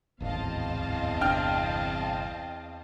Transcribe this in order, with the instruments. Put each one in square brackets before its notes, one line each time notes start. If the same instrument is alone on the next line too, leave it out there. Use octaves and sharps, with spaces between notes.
[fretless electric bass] D1 G#1 [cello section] E2 C4 [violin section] D#5 F5 A5
[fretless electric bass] G1 C2 D4 [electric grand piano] G5 F6